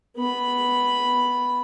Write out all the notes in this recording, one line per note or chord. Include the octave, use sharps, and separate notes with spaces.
B3 B5